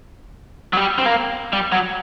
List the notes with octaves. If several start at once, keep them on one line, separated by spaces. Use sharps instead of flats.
F#3
G3
C4
A#3
G3
F#3